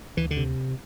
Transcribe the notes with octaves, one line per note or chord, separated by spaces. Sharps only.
D2 E3
D3
C3